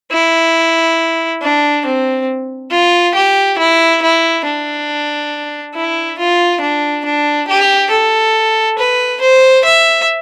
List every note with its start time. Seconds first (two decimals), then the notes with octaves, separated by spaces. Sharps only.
0.12 E4
1.42 D4
1.86 C4
2.71 F4
3.15 G4
3.58 E4
4.02 E4
4.45 D4
5.75 E4
6.18 F4
6.61 D4
7.05 D4
7.48 G4
7.91 A4
8.78 B4
9.21 C5
9.65 E5